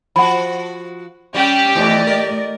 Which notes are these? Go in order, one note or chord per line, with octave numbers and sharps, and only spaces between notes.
F3 F#4 F#5 B5
G3 C#4 G4
E2 E3 A3 D5 D#5
A#4